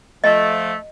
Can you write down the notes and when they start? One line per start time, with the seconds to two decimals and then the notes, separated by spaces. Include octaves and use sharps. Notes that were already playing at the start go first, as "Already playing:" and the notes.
0.24 F3 A3 D#5